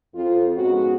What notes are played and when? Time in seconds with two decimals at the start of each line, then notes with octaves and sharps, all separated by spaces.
0.15 F2 F4
0.56 G#2 B3 C#4 D#4 F#4